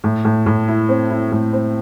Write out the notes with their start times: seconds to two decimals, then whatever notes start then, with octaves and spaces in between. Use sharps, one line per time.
0.04 A2
0.25 A2
0.46 A2
0.68 E4
0.89 C4
1.10 E4
1.32 A2
1.53 C4